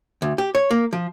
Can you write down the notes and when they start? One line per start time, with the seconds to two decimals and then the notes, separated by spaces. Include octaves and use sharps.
0.22 D2
0.38 G4
0.55 C#5
0.71 A#3
0.93 F3